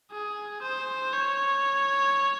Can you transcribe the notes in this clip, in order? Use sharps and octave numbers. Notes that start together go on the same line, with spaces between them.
G#4
C5
C#5